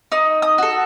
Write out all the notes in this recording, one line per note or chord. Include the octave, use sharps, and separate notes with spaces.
D#4 D#6
D#6
F#4 A4